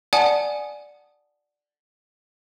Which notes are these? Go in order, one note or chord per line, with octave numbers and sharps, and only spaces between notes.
D5 F#5 G#5 A5 D#6